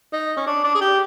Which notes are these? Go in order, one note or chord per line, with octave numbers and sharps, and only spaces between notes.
D#4
C#4
D4
D4
G#4
G4